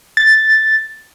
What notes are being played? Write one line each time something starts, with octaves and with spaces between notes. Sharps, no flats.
A6